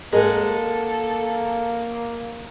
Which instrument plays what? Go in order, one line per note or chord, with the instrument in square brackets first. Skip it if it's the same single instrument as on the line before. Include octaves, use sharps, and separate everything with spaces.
[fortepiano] G#3 [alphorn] A#3 [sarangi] A4 [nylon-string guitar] A#4 D#5 F#5